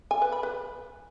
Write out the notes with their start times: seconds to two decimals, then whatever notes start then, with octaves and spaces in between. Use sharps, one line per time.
0.11 G#5
0.22 B4
0.32 B5
0.43 B4